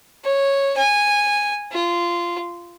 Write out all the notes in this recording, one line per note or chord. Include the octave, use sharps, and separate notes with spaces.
C#5
G#5
F4